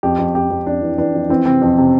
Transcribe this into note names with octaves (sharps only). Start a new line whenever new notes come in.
F2 G4
F2
F2 G4
F2
F2 D4
E3
E3 D4
F2
E3 C4
C3 C4
F2
C3